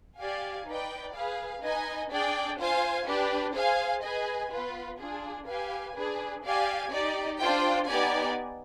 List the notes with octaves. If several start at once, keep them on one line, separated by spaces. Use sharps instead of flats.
G4 D5 F5 G#5
D#4 B4 D5 G5
G#4 B4 F5
D#4 B4 D#5 G#5
D4 G#4 D5 G5
F4 C5 F5 G#5
D4 G4 B4
G#4 C5 F5 G#5
G#4 B4 D#5 G#5
B3 F4 B4
D4 F4 G#4
G4 B4 F5 G#5
D4 G#4 B4
G4 D5 F5 G#5
D#4 G4 D5
D4 F4 C5 G5
B3 D#4 G4 D5 G#5